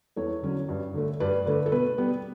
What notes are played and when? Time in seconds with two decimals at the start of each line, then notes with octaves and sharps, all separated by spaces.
0.16 E2 A4 C#5
0.43 D3 F#3 C#4
0.69 G2
0.94 D3 A3
1.20 G2 B4 D5
1.46 D3 A3 B4
1.66 A4
1.72 B2 B4
1.98 G3 B3